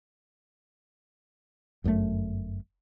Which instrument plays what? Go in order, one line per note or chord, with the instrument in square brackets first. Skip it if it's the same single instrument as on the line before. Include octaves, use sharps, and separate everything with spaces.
[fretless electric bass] G1 F#2 C3 A3